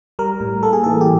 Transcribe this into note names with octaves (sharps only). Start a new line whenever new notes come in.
G3 A#4
A2
A#3 A4
G#4
E3 A4
G4